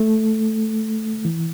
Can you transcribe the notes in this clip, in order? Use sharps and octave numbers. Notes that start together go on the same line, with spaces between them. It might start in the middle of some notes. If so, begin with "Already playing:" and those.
Already playing: A3
E3